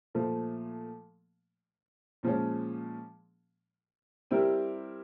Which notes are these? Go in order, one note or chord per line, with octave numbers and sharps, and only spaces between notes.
A#2 F3 A3
A#2 F3 G#3 C#4
G3 C4 E4 G4 A#4